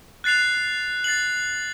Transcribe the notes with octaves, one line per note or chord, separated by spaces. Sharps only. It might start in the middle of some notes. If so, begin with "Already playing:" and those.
F#6 A6 C7 F7
A6 C7 F#7